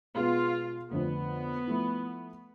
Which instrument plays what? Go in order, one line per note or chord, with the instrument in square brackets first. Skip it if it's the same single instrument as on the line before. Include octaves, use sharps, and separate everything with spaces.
[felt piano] B2 G#3 B3 [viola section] F4
[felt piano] F2 D3 A3 [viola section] B3
[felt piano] F3 A3 E4